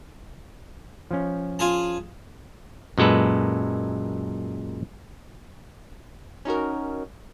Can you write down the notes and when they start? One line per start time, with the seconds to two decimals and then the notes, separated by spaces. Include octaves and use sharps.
1.11 F3 C#4
1.59 F4 G#4 A5
2.98 F#2 A#2 G#3 A4 B4
6.45 C#4 D#4 F#4 A#4